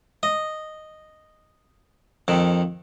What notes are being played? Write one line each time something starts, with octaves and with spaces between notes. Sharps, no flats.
D#5
F2 D#3